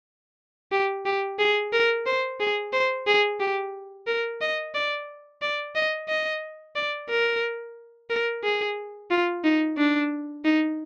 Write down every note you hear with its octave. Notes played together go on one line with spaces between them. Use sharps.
G4
G4
G#4
A#4
C5
G#4
C5
G#4
G4
A#4
D#5
D5
D5
D#5
D#5
D5
A#4
A#4
G#4
F4
D#4
D4
D#4